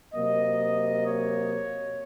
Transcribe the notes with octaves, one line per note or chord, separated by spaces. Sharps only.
C3 F#3 A#3 D#5
C#5